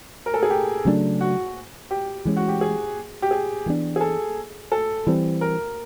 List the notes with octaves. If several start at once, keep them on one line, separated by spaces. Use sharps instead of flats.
A#4
A4
G#4
G4
C#3 F#3 A3 D4
F#4
G4
E3 G#3 C#4
F#4
G4
G#4
G4
G#4
E3 G#3 B3 D4
G#4
A4
A4
E3 G3 C4
A#4